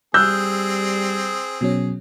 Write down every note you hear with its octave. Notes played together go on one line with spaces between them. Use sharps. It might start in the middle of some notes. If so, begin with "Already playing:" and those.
G3 C4 G#4 E6 F#6 G6
B2 F#3 C#4